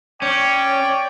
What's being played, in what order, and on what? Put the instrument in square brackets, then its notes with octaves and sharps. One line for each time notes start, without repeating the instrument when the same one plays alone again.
[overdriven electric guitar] C#4 [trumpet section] C#5 D5 G5